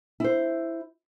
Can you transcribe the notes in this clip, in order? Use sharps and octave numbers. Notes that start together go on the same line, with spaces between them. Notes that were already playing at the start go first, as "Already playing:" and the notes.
E4 C5